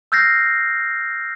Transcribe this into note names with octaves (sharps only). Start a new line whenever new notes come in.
E6 F6 G6 A6 A#6 C7